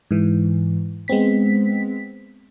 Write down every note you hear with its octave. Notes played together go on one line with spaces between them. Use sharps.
G#2 E3
G#3 B3 C4 B6